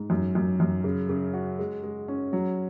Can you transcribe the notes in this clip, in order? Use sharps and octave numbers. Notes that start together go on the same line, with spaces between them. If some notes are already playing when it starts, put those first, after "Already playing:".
Already playing: G#2
F#2
F#2
F#2
C#3
C#3
F#4
G#3
G#3
C#4
F#3